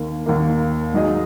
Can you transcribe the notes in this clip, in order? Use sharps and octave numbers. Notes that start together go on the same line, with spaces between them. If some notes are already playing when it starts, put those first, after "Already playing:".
Already playing: D#2 D#3 A#3
D#2 D#3 A#3
G#2 F#3 D#4 G#4 D#5